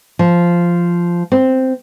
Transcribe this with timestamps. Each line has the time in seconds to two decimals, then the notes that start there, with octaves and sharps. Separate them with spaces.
0.19 F3
1.32 C4